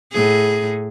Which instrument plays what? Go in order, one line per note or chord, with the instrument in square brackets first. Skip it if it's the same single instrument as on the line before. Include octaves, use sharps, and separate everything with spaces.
[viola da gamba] A2 G#4